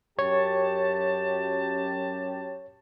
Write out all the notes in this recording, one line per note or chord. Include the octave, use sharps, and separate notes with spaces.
F#2 G4 C#5 A5